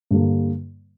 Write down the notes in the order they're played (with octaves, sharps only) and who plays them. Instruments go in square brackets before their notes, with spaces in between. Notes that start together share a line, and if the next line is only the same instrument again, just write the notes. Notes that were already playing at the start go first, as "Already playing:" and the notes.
[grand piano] G2 D3 G3 A#3